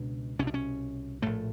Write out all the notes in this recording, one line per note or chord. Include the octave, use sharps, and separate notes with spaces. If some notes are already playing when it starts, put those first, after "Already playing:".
Already playing: C#2 B2 D4
C2 B2 C#4 D4
C#4
A#1 A2 A3